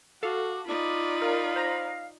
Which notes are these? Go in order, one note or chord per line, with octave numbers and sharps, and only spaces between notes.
F#4 A4 F5 D6
D#4 F4 D5 B5 D6
A#4 F5
C5 A#5 A#6